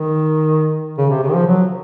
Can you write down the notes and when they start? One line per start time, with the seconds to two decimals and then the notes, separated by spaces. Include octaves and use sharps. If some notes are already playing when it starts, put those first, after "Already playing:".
Already playing: D#3
0.98 C#3
1.10 C3
1.22 C#3
1.29 D#3
1.34 F3
1.47 F#3